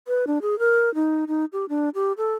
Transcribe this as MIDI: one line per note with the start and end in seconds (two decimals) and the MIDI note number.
0.08 0.25 71
0.27 0.38 62
0.42 0.58 68
0.59 0.93 70
0.95 1.25 63
1.28 1.45 63
1.53 1.65 67
1.69 1.89 62
1.95 2.13 67
2.18 2.34 69